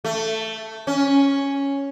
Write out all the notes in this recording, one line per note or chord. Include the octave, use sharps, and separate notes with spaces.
A3
C#4